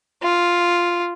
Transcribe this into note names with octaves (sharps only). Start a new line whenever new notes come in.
F4